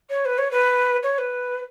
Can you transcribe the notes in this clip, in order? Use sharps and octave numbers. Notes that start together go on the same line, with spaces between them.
C#5
B4
C#5
B4
C#5
B4